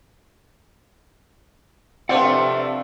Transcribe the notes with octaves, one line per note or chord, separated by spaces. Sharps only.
C3 F3 A3 C4 D4 C5 D5 F#5